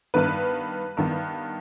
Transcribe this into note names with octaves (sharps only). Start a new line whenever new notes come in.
G2 D#3 B3 B4
G2 D#3 B3